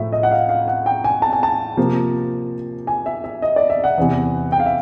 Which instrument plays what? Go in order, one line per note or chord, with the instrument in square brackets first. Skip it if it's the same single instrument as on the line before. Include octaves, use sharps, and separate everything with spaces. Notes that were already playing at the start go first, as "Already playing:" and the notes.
Already playing: [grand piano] A2 F3 A3 E5
D#5
F#5
F5
F5
F#5
G5
G#5
A5
G#5
A5
C3 F3 A#3
G#5
E5
E5
D#5
D5
E5
F#5
E2 C3 E3
G5
F5
E5